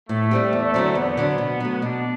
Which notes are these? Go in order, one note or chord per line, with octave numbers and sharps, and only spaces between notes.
A2 A3
G3 C4 G4
E2
D3 F#3 C4
E2 B3
D3 F#3 C4
B2
F#3 A3
B2 D4